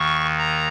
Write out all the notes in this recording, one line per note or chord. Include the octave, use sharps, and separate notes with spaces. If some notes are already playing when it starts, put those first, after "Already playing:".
Already playing: D#2 D#3 C#6
A#5